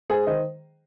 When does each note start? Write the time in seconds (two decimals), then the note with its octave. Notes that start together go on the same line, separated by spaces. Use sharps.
0.10 G#3 G#4 C5
0.27 D#3 C5 D#5